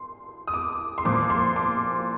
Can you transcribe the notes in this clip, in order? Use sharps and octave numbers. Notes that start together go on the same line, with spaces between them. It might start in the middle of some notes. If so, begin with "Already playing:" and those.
Already playing: C6
D#6
D6
C6
A#2 F3 D6
C6
D6